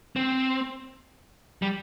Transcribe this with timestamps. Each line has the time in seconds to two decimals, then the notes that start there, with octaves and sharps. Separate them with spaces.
0.16 C4
1.62 G3